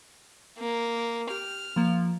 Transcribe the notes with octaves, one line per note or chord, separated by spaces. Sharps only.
A#3
G4 F6
F3 A#3